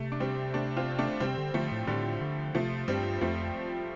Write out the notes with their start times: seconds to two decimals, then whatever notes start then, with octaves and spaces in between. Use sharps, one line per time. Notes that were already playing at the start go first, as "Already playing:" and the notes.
Already playing: C3 A3
0.12 D4
0.20 G3 C4
0.54 A3 D4
0.77 C4 F4
0.99 A3 D4
1.20 C3 G3 C4
1.38 D3
1.54 D3 F3 A3
1.72 A2
1.87 A2 D3 G3
2.21 D3
2.55 C3 F3 A3
2.88 G2 G3 C4
3.21 F2 F3 A3